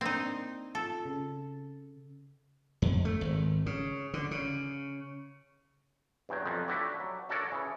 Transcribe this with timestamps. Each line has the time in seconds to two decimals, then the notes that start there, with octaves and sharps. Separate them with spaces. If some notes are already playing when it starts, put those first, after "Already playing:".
0.01 A#3 C4 D4 D#4
0.75 F4 A4
1.05 C#3
2.82 F2
3.05 A3
3.21 G#1
3.66 C#3
4.14 D3
4.31 C#3
6.29 E2 G2 F#3 G5
6.45 F2 F3 F#3
6.68 A3 D4 E4 F#4 G4
7.00 F#3
7.29 D4 F#4 A4 A#4 C#5 D5
7.52 C#3 E3